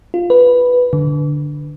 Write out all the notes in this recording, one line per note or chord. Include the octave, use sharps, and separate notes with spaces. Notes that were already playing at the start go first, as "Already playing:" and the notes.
F4
B4
D3